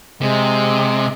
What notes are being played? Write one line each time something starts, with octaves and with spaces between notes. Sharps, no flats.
C3 G#3